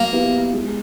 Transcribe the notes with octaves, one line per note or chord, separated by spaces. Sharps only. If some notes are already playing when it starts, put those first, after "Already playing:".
Already playing: F#3 A#3
B3 E4 G4 B4
G#3